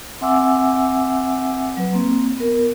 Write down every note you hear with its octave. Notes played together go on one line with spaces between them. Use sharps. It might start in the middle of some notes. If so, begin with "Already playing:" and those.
C4 E5 F#5 G#5 D6 E6
F#3 B4
A#3 C4
B3 A#4